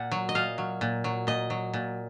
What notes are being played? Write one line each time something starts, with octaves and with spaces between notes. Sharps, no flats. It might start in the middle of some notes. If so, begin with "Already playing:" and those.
Already playing: A#2 F#5
F#3
D#5
A#2 F5
F#3
A#2
F#3
A#2 D#5
F#3
A#2